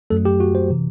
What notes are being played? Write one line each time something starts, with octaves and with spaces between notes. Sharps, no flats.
F#2 F#3 A3 A4
G4
F#4
C5
C3 E3